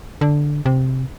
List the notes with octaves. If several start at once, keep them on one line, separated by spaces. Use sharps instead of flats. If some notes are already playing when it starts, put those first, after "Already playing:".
D3
C3